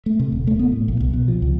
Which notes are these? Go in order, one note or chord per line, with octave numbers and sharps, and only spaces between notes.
A3
C3
D#1
A3
B3
A2
A#1
C2
B2
F3
C#2